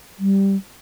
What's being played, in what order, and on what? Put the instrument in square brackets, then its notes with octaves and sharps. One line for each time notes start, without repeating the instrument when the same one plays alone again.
[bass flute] G3